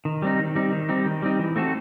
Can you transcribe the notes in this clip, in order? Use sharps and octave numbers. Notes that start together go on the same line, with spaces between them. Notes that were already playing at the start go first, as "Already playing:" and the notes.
D#3
G3 C4 D#4
D#3
G3 C4 D#4
D#3
G3 C4 D#4
D#3
G3 C4 D#4
E3
A3 C4 F#4 A4